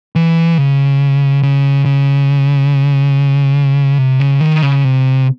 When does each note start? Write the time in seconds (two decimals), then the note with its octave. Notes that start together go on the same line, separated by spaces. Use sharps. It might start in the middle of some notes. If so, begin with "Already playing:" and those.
0.16 E3
0.58 C#3
1.43 C#3
1.85 C#3
3.98 C3
4.20 C#3
4.41 D#3
4.62 C#3
4.84 C3